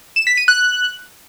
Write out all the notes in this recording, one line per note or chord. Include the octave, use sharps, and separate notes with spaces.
E7
B6
D#7
F#6